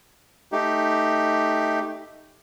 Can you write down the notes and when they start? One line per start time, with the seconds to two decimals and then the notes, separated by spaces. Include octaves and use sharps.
0.52 A3 D#4 G4